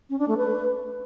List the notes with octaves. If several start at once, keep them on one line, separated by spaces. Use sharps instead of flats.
C#4
D4
A3
B4